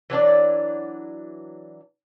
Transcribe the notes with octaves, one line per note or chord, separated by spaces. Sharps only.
E3 F#3 D4 D5